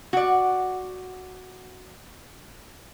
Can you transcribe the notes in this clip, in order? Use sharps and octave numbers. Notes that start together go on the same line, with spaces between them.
F#4 D5